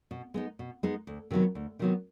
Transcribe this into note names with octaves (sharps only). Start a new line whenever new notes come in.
B2
G#3 B3 D#4
B2
G#3 B3 D#4
D2
C3 D#3 F#3 B3
D2
C3 D#3 F#3 B3